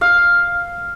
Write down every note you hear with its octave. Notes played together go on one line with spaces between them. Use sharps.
F5